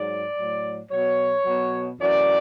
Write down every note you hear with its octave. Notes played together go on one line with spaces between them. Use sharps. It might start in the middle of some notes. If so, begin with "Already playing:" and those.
Already playing: G#2 F#3 D5
A2 F#3
B2 F#3 C#5
B2 F#3
F#2 E3 D5